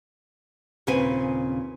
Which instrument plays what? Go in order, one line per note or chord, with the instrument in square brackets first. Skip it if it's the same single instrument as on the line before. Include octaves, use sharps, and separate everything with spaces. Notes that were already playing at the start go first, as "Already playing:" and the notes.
[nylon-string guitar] D#2 A#2 C#3 C4 B4 G#5